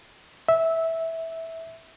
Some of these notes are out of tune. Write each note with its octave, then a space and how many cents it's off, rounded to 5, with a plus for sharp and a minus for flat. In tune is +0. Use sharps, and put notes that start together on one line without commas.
E5 -10